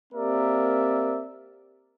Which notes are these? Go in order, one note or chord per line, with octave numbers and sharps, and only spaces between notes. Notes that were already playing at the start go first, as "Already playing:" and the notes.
A#3 C4 G4 A#4 D5 E5